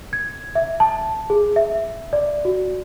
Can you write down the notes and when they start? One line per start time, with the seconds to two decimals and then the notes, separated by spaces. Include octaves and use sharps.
0.13 G#6
0.55 E5
0.80 A5
1.30 G#4
1.56 E5
2.13 D5
2.45 F#4